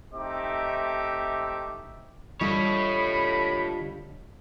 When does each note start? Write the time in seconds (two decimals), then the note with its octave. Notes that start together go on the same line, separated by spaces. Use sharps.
0.14 A3 C4 D#4 G4 E5 D6
2.41 D3 G3 F4 A4 C#5 D#5 B5